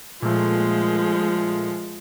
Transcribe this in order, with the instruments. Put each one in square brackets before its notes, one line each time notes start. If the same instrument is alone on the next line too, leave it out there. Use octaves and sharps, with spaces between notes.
[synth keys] A#2 A3 [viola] F3 G#3